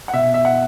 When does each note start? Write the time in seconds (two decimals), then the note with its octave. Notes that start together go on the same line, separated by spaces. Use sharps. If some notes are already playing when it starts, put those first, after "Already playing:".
0.08 F#5
0.13 B2 E5
0.34 E5
0.45 F#5